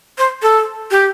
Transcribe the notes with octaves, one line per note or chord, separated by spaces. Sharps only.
C5
A4
G4